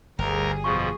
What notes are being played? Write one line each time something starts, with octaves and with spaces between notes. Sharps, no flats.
G1 D2 G3 G#4 A#4 A#5
F2 B2 F3 C#6